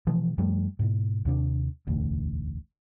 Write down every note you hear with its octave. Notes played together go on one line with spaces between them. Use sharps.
B2 E3 F3 G#3
F#2 F3 G3 A3
G#2 B2
D#2 C3 D4
E1 A1 D2